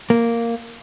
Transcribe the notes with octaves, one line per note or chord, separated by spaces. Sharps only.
A#3